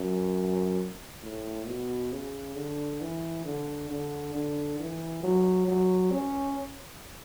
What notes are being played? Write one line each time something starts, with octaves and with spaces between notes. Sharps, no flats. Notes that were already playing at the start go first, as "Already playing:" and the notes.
Already playing: F#2
A2
B2
C#3
D3
E3
D3
D3
D3
E3
F#3
F#3
C#4